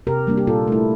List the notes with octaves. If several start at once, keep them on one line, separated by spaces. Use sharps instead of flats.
C3 G4 A#4
G3 A#3 D4
G4
A#2 F4 A4
A3 E4